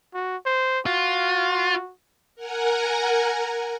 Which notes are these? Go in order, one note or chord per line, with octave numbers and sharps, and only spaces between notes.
F#4
C5
F4 F#4
A#4 F#5 G#5 A#5